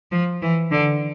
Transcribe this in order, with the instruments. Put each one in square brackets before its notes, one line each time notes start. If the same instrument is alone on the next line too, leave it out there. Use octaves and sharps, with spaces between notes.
[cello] F3
E3
D3